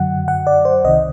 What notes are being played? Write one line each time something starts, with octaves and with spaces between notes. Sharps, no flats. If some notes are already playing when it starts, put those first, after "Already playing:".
Already playing: F#2 D3 F#3 F#5
F#5
D5
C5
C2 C3 D#3 D#5